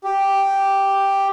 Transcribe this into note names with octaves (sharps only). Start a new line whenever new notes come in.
G4